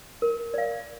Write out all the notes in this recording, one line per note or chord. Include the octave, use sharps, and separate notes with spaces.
A#4
D5 F5